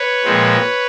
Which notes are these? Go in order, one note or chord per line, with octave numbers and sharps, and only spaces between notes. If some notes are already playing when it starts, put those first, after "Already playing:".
Already playing: B4 C#5
A#2 F3 G#3 C4